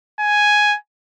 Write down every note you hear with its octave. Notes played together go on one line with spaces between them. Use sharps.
G#5